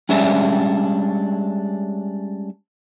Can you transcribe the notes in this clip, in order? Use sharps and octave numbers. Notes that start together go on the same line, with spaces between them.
G3 G#3 C#4 D4 C#5 E5